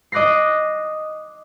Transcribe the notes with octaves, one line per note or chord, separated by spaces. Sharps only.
D#5 D6 F#6 A#6 C7